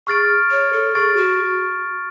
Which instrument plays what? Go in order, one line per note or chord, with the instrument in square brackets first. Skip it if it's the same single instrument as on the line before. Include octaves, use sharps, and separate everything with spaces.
[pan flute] G#4 [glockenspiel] C#6 F6 A6 D7
[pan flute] C#5
A4
[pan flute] G#4 [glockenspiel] C#6 F6 A6 D7
[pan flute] F#4